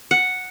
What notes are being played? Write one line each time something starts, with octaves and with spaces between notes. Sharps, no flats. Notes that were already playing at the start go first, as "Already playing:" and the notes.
F#5